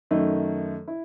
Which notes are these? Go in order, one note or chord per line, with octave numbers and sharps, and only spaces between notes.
F#2 D#3 A3 D#4
E4